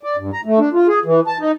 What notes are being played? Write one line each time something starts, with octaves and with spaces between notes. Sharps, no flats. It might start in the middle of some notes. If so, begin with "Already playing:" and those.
D5
G2
A#5
A3
D4
F4
G#4
E3
A5
D#4